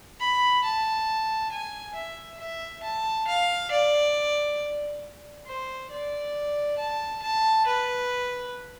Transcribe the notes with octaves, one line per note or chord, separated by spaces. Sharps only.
B5
A5
G#5
E5
E5
A5
F5
D5
C5
D5
A5
A5
B4